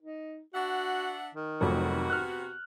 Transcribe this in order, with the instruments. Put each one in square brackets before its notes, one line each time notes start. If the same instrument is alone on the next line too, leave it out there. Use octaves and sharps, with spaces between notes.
[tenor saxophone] D#4
[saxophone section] D4 E5 F#5 [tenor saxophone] F#4
[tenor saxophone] D#3
[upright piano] F1 F2 F#3 [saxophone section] C3 B3 F#4
[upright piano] F6 F#6